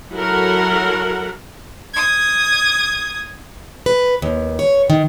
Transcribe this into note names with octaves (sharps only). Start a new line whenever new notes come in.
F#3 E4 F#4 A4 A#4 F#5
D#6 G#6
B4
D#2
C#5
D#3